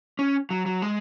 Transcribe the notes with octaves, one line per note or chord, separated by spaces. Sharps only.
C#4
F#3
F#3
G#3